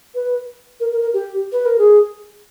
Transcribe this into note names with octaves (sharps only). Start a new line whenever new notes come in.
B4
A#4
A#4
A#4
G4
B4
A#4
G#4